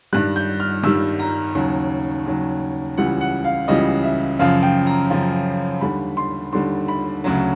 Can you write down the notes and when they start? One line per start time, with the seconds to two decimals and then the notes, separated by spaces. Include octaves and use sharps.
0.13 G2 D#3 G3 F#6
0.36 G6
0.60 F6
0.84 G2 D#3 G3 E6
1.19 A#5
1.55 D#2 C#3 F#3
2.26 D#2 C#3 F#3
2.97 C#2 C#3 E3 G3 F#5
3.21 F#5
3.44 F5
3.68 C#2 C#3 E3 G3 D#5
4.04 E5
4.39 F#2 C#3 F3 F5
4.63 G5
4.87 A#5
5.10 F#2 C#3 F3
5.81 D#2 D3 G3 B5
6.17 C6
6.53 D#2 D3 G3 C6
6.88 B5
7.24 D2 C#3 F#3